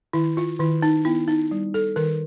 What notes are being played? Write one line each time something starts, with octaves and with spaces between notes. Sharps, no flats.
D#3 E4
F4
D#3 E4
D#4
B3 E4
D#4
G3
A4
D#3 A#4